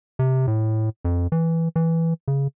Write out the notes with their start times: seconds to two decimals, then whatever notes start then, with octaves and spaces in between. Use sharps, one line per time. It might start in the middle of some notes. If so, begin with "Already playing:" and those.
0.19 C3
0.47 A2
1.05 F2
1.32 E3
1.76 E3
2.28 C#3